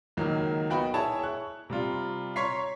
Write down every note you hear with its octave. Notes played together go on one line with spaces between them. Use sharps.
C#2 D#3 F#3 A#3
B3 D#4 F#4 F#5 G5 B5
E4 G#4 C#5 A5
C#6 F#6
C3 G3 F4
C#5 A#5 C6 C#6 B6 C7